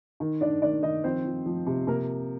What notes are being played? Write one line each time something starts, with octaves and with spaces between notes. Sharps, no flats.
D#3
D#3 D4 D5
D#3 D4 D5
D#3 D#4 D#5
F3 C4 C5
F3
F3
C3
C3 A#3 A#4